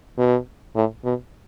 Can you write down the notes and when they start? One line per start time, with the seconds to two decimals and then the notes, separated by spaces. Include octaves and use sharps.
0.18 B2
0.75 A2
1.04 B2